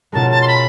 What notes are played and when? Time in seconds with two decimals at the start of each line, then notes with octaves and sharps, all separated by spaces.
0.12 B2 G#3 C#4 F4 A#4 A5
0.31 A5
0.42 C6
0.48 B5